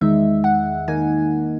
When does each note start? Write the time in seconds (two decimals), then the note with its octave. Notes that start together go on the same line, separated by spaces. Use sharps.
0.01 E2 D#3 G#3 D#4 E5
0.44 F#5
0.88 D#3 A#3 D#4 G#5